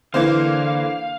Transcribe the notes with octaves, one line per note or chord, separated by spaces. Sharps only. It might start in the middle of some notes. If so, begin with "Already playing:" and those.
D3 E3 A#3 C5 F5